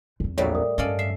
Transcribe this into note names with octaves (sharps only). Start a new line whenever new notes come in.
E2 C4
A#1 A2 F#3 G3 C#5
A#4 D#6
G2 C#4 A4 D5 D#5 F5
E5 C7